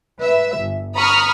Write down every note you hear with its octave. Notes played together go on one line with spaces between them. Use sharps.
B4 E5
G1
A#5 B5 C#6 D#6 F6